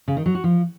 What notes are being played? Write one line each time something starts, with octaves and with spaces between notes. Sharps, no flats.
C#3
D#3
F#3
F#4
F3